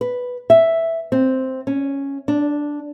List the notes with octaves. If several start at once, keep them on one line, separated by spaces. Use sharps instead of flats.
B4
E5
C4
C#4
D4